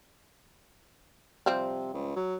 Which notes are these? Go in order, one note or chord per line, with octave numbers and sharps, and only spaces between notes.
C3 F3 G3 C4
C#2
F#3